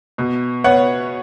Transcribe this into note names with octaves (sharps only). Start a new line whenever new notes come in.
B2
B3 C#5 F#5